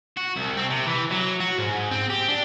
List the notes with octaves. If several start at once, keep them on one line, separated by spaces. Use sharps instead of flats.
F#4
C2
C4
C3
E3
F#3
F#4
G#2
C4
G4
D4